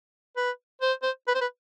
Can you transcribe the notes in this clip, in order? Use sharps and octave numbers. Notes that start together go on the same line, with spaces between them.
B4
C5
C5
B4
C5
B4